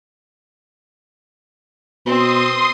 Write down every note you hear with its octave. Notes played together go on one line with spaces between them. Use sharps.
B2 C4 C6 D#6